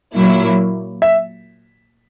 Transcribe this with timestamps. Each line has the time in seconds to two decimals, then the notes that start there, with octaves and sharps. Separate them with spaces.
0.15 A#2 F#3 A#3 E4
1.02 E5